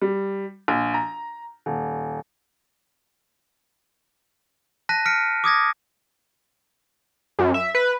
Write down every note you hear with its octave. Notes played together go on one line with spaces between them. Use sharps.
G3
A#1
A#5
D#1
A5 F#6 A#6 B6 D#7
F6 B6 C#7 D7
D6 D#6 G#6 A#6
F#2
E5
B4